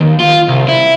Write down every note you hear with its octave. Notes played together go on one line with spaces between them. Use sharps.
D#2
F4
C2
E4